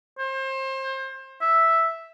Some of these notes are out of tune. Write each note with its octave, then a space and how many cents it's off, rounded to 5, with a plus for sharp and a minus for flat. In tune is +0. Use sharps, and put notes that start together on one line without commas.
C5 +30
E5 +0